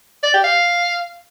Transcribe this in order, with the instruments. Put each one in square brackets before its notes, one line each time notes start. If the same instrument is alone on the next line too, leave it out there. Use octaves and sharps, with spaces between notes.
[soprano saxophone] D5
G4
F5